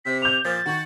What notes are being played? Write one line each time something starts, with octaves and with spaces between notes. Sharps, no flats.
C3 B6
D6 G6 F7
A#2 F3 A6
D#3 F#4